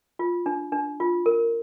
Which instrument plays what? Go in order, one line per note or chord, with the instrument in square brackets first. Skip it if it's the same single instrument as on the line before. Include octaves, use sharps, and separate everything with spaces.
[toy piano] F4
D4
D4
F4
A#4